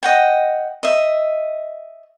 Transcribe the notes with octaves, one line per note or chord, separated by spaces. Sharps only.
D#5 F#5 G5
D#5 E5